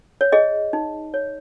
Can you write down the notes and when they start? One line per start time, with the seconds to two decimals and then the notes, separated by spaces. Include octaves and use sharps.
0.21 C#5
0.32 G#4 D#5
0.73 D#4
1.14 C#5